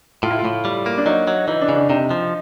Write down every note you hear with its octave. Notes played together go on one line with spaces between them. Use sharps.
A2 F4
E4
F4
A2
G3
A#3
D4
F#3 D#4
F#3
E3 D#4
D4
C#3
D4
C3 D#4
F3